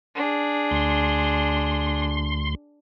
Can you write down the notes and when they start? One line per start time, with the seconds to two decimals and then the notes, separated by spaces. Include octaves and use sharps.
0.15 D4 G#4
0.71 D2 C6